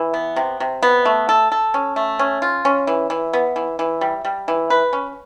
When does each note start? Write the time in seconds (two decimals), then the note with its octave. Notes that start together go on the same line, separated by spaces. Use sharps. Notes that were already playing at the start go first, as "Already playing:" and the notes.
Already playing: E3
0.14 B3
0.36 C3
0.60 C3
0.83 B3
1.05 A3
1.29 A4
1.52 A4
1.74 C#4
1.96 A3
2.19 C#4
2.42 F4
2.65 C#4
2.87 E3
3.10 E3
3.33 B3
3.56 E3
3.79 E3
4.01 G3
4.25 G3
4.48 E3
4.70 B4
4.93 C#4